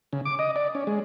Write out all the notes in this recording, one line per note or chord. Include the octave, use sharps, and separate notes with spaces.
C#3
D6
D#5
D5
C#4
G#3